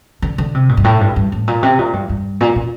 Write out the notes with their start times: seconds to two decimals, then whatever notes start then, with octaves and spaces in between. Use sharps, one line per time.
0.22 D3
0.38 D3
0.54 C3
0.69 A#2
0.77 G2
0.84 A2
1.01 G2
1.16 G2
1.32 A2
1.48 A#2
1.63 C3
1.79 A#2
1.93 G2
2.09 G2
2.41 A#2
2.56 A#2